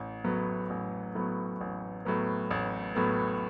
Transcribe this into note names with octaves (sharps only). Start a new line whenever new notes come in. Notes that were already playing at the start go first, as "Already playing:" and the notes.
Already playing: A1
A2 F#3 B3
A1
A2 F#3 B3
A1
A2 F#3 B3
A1
A2 F#3 B3